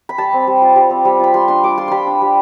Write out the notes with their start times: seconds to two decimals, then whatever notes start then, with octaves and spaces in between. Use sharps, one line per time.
0.09 B5
0.18 G3 A5
0.33 C4
0.47 G3
0.62 F4
0.76 G3
0.90 C4
1.05 G3
1.20 F4 B5
1.34 G3 C6
1.48 D4 C6
1.63 G3 D6
1.78 F4 C6
1.88 G3 B5 C6
2.07 D4
2.22 G3